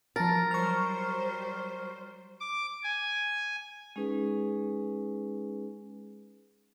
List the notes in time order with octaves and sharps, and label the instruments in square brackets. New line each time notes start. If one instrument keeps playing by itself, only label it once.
[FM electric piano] F3 A5 A6 [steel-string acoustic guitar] A#4
[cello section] F#3 G3 C5 [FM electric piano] C#6 F6
[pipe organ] D6
G#5
[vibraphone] G#3 C#4 D#4 G#4 B4